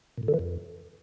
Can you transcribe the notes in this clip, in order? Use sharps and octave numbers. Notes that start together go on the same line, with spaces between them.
A#2
A2
D3
E3
F2